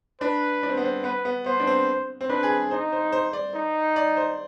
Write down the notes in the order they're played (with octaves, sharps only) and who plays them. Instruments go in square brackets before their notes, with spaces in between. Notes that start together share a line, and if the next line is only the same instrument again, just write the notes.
[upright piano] D4 [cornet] B4
[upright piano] D4
C4
B3
C4
[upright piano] B3 [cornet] B4
[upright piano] B3
[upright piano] B3 [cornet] C5
[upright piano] D4
C4
C4
[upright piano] D4 [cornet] B4
[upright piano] G#4
[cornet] D#4 [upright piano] C5
[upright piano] C5
C5
D5
[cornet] D#4
[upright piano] D5
C5